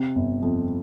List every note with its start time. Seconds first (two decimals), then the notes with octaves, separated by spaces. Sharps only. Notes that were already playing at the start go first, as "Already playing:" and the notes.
Already playing: C3
0.16 G1
0.42 F2